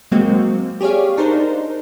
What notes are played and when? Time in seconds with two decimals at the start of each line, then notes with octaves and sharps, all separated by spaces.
0.11 F#3 G#3 A#3 C4 F#4
0.81 G4 G#4 C#5 D5 F5
1.17 D4 D#4 A#4 C5